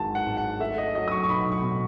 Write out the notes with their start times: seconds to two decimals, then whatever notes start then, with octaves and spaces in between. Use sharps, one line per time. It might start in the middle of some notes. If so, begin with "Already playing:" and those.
Already playing: G#1 D#3 G#3 A5
0.15 F#5
0.26 G#2
0.37 F#5
0.60 A3 E5
0.78 D#5
0.95 F#3 D#5
1.08 D#6
1.12 C#6
1.24 C#6
1.29 B1 B5
1.52 C#6
1.62 B2